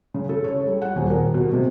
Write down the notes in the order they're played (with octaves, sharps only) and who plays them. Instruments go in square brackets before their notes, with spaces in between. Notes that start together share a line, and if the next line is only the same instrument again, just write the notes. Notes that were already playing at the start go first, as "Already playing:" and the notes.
[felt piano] C#3
A4
C#5
G3
F#5
D#1
A#4
B2
C3